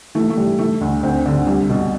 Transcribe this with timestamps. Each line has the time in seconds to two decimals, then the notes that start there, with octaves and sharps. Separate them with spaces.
0.15 E3 A3
0.30 A3
0.37 E3 G3
0.59 E3 A3
0.81 D2
1.03 D2 C4
1.26 D3
1.47 C2
1.69 B2